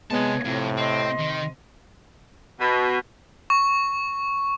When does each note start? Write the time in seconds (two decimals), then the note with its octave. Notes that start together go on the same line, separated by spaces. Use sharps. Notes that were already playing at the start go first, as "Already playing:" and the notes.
0.10 C3 G#3 B3 C#5 A5
0.45 F2 A2 C3
0.77 C4 D#5 C6
1.19 D#3
2.59 B2
3.50 C#6